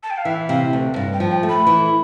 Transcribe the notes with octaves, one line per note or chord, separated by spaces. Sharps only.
A5
G5
F5
E3 E5
C3 F5
D2
G2
G5
F3
G5
A3
B5
E3